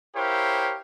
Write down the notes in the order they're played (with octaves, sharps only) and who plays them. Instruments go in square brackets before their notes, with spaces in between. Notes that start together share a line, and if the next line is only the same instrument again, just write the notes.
[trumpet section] E4 G4 A#4 C5 C#5 F5